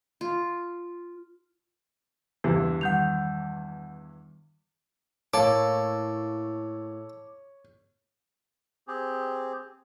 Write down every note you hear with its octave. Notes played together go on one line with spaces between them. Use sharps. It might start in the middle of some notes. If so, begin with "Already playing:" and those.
F4
E2 G2 E3 G4
D#3 G3 F#5 D#6 G6 F7
A2 A#3 A4 C#5 D6
C4 G4 G#4